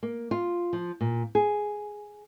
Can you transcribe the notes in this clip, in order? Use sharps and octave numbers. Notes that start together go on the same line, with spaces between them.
A#3
F4
F3
A#2
G#4